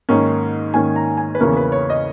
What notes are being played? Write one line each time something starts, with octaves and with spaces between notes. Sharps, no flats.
G#2 D#3 A#3 C#4
G#2 D#3 A#3 C#4 G#5
A#5
G#5
B4
E2 C#3 E3 A#3 C#4 A#4
B4
C#5
D#5